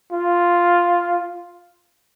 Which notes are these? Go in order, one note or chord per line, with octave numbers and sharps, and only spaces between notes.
F4